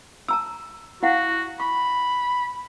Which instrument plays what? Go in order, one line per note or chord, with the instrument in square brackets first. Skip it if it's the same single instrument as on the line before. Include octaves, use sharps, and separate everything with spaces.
[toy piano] A5 A#5 E6
[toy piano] E4 F5 F#5 [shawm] F#4
[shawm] B5 [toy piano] C#6